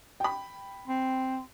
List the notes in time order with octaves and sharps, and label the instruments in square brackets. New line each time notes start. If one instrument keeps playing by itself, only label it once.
[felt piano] G5 B5
[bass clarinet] C4